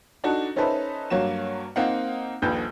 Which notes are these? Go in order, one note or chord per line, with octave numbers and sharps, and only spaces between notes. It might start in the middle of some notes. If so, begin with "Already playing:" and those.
D4 D#4 F#4 A4
C#4 D#4 A4 B4 C5 E5
G2 F#3 A#3 F#4 E7
A#3 C4 D#4 F5 F#5
D#1 A#1 D#2 B4 G6